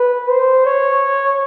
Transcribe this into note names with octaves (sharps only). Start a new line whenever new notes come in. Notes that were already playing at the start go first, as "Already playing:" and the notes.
Already playing: B4
C5
C#5